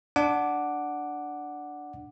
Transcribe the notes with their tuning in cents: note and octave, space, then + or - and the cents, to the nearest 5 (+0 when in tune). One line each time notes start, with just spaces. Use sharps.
D4 +0 F#5 +0 D6 +0